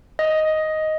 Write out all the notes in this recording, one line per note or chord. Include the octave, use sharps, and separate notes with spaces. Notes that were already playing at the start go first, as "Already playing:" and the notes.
D#5